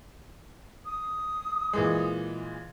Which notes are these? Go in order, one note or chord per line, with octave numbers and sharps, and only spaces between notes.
D#6
A#2 E3 G#3